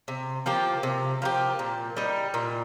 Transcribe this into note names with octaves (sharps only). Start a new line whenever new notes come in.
C3
F3 A#3 G4
C3
F3 A#3 G4
A#2
G3 D#4
A#2